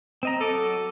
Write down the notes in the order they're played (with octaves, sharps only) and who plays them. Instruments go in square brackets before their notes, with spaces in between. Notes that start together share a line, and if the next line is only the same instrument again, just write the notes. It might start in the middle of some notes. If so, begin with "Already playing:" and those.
[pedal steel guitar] C4 D#5 A#5
[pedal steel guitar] F#3 D6 D#6 [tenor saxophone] A4